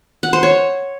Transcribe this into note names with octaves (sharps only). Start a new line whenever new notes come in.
F#5
C5
C#5